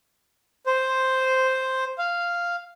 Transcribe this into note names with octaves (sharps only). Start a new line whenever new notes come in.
C5
F5